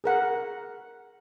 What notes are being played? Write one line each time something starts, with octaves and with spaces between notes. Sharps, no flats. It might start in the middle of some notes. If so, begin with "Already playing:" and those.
G#4 A#4 F#5